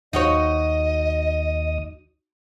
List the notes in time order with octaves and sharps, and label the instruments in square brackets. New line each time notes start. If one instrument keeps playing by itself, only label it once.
[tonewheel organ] D#2 D#6 [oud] D#4 F#4 C#5 [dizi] D#5